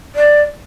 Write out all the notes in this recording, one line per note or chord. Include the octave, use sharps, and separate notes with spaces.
D5